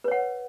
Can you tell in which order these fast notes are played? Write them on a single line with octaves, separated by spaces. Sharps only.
B4 C#5 F#5